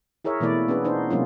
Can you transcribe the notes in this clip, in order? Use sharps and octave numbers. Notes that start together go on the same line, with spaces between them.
E4 G#4 A#4 C#5 E5
B2 E3 A3 A#3 E4 D5
B3 C#4 D4 G#4 B4
B3 D4 D#4 C5
C3 F#3 G#3 A#3 C#4 F4